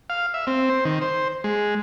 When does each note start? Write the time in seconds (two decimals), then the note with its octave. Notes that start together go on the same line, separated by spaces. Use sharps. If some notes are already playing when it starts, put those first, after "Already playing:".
0.10 F5
0.34 E5
0.47 C4
0.70 C5
0.85 D#3
1.02 C5
1.44 G#3